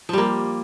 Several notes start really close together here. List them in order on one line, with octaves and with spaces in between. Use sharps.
F3 G3 A#3